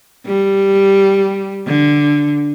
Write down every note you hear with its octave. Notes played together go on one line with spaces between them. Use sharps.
G3
D3